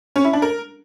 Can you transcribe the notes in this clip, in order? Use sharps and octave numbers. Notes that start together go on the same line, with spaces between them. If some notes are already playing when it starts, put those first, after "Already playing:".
C#4
E4
D4
A#4